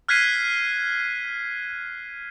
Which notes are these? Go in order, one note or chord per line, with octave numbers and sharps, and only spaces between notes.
F6 F#6 G#6 B6 C7 D#7